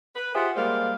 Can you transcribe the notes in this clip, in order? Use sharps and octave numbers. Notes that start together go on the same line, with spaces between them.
B4
F4 G4 G#4 C5 E5 F#5
G3 G#3 A#3 C5 F5